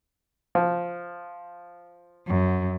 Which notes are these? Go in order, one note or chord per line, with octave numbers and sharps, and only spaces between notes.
F3
F#2